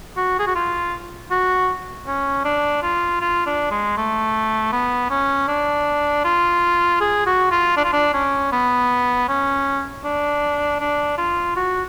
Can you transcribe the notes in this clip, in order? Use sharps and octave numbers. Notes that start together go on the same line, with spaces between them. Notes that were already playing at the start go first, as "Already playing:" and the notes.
F#4
G#4
F#4
F4
F#4
C#4
D4
F4
F4
D4
G#3
A3
B3
C#4
D4
F4
G#4
F#4
F4
D4
F4
D4
C#4
B3
C#4
D4
D4
F4
F#4